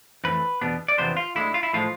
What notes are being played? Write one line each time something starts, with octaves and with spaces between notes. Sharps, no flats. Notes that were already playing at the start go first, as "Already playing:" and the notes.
F2 E3 A3 B4
E2 B2 B3 D4
D5
E2 C3 F3 B3 D4 C5
F4
D2 D3 G#3 E4
F4
E4
A2 F3 G#3 F4